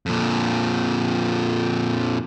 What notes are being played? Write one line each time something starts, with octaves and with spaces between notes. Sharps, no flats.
F2 A#2